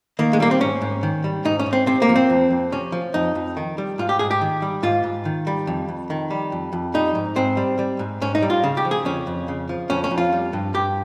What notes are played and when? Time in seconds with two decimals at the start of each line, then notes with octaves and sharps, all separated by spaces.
0.19 D#3 A#3
0.33 G#3
0.40 G3 A#3
0.51 C4
0.60 G#2 C#4
0.82 G#2
1.03 D#3
1.24 G3
1.45 G#2 D#4
1.59 C#4
1.66 G#2
1.73 C4
1.87 C3 C4
2.02 A#3
2.09 F3
2.16 C4
2.30 F2
2.51 F2
2.72 C3 C#4
2.92 F3
3.14 F2 D#4
3.35 F2
3.57 D#3
3.78 G3
3.98 G#2 F4
4.09 G4
4.19 G#2 G#4
4.31 G4
4.41 D#3
4.62 G3
4.83 G#2 F4
5.04 G#2
5.25 D#3
5.47 G3
5.67 F2
5.89 F2
6.10 D#3
6.31 G3
6.52 F2
6.73 F2
6.94 G3 D#4
7.15 G#2
7.36 G#2 C4
7.57 G3
7.79 G3
7.99 G#2
8.21 G#2 C#4
8.35 D#4
8.42 G3
8.50 F4
8.64 C#3
8.77 G4
8.85 F3
8.91 G#4
9.05 F2 C#4
9.27 F2
9.48 C#3
9.69 F3
9.90 F2 C#4
10.04 C#4
10.11 F2
10.18 F4
10.32 G3
10.53 G2
10.74 G2 G4